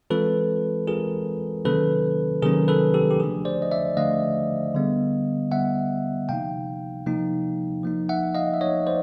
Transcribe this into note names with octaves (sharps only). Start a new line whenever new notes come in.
E3 G#3 C4 F4 A4 B4
E3 G#3 C4 F4 G#4 A#4
C3 D#3 F#3 A#3 C#4 A4 B4
C3 D#3 F#3 A#3 C#4 G#4 A#4
A4 B4
G4 A4
G4
D3 F3 A3 D4 G#4
C5 D5
D#5
D5 E5
D3 F3 A3 D4 D#5 F5
D3 G3 B3
D3 G3 B3 E5 F#5
C3 F3 A#3 D#4 F5 G5
C3 F3 A#3 D#4
F3 A#3 D#4
E5 F#5
D#5 F5
E5
F3 A#3 D#4 C#5 D#5
C5 D5